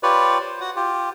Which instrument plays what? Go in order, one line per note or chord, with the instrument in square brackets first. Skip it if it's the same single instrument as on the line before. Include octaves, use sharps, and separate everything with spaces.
[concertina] F4 G4 B4 C#5 D5
C5
F#4 F#5
F4 G4